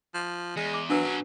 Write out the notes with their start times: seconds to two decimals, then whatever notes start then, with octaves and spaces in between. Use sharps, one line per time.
0.14 F3
0.57 E2 G#3
0.74 D6
0.90 F#3 D4 A#4 B4
1.05 B2 C#4